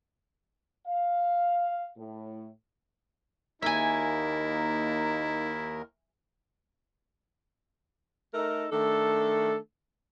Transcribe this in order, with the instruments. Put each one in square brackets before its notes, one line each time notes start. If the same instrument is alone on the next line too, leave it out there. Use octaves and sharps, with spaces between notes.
[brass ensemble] F5
A2
[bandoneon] D#2 A#4 [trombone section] A#3 D#4 [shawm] E4 [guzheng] E5 G#5
[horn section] A3 D#4 A4 A#4
D#3 A3 D4 A4